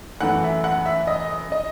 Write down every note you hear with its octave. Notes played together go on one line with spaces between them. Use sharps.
F#2 E3 A3 F#5
E5
F#5
E5
D#5
D#5